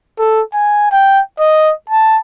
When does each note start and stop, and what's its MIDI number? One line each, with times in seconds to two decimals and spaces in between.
0.19 0.41 69
0.54 0.88 80
0.91 1.20 79
1.39 1.73 75
1.90 2.18 81